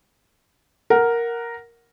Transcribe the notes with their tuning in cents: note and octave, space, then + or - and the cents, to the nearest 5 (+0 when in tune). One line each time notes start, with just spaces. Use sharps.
A#4 +0 F#5 +0